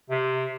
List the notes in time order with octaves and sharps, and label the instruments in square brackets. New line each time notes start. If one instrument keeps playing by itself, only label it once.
[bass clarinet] C3